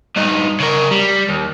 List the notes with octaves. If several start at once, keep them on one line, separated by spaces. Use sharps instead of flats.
G2 D#4
C#3 A#4
G3
D#2